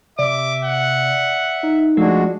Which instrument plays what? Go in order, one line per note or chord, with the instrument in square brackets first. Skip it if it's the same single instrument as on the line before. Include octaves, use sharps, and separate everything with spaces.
[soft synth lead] C3 [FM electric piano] D5 [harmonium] E5 [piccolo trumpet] D6
[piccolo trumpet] F#5
[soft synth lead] D#4
[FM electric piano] F3 A3 F4 [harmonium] G#3 D4 F#4